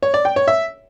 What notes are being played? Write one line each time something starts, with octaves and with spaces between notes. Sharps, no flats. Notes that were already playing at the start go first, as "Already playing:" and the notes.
C#5
D5
G5
C#5
E5